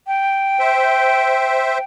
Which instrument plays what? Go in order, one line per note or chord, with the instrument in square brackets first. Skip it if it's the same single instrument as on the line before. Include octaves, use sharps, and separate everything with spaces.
[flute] G5
[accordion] C5 E5